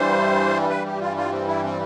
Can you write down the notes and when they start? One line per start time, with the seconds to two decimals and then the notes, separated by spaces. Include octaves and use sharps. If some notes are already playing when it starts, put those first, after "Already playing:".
Already playing: G2 E3 G3 C5
0.69 B4
0.86 G4
1.00 F4
1.17 F4
1.32 C4
1.47 E4
1.64 C4